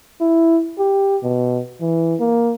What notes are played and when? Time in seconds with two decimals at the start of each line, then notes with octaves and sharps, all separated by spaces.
0.21 E4
0.79 G4
1.23 B2
1.81 E3
2.20 A#3